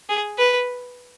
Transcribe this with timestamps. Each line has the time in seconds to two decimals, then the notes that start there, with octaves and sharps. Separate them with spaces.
0.09 G#4
0.38 B4